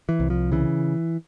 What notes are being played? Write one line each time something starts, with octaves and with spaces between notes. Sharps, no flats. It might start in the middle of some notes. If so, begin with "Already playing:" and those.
E3
C2
F3
C#3 E3